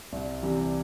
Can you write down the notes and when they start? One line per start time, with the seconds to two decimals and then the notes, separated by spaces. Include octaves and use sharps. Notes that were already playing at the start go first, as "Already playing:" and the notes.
0.13 C2
0.42 C3 E3 G3